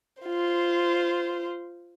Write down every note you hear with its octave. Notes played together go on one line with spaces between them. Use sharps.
F4 C5